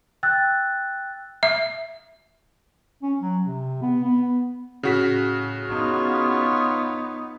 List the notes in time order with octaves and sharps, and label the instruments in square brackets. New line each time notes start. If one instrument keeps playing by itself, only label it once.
[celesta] G5 E6 F#6 A6
[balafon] E5
[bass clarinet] C#4
F#3
C3
B3
B3
[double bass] A2 [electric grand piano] C#3 F#4 B6
[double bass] B3 D#4 [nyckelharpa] F4 C#5